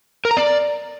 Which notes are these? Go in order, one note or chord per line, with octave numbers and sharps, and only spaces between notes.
A#4
A#5
D5